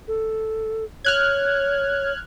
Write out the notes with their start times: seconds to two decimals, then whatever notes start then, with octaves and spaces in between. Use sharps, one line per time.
0.08 A4
1.05 C#5 F6 F#6 G#6